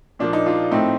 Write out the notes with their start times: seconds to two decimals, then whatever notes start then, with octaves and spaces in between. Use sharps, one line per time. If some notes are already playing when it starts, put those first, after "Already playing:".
0.19 A#2 F3 A#3 D4
0.33 D#4
0.46 D4 F4
0.71 A2 A3 C4 D#4